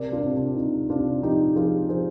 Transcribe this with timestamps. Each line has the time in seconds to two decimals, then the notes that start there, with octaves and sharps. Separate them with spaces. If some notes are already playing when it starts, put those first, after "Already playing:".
Already playing: C3 A#4 D5
0.12 D4 F4
0.23 C3
0.34 D4
0.56 C3 D#4
0.90 C3 D4 F4
1.22 F3 D#4 G4
1.56 F3 F4 G#4
1.89 F3 G#4 C5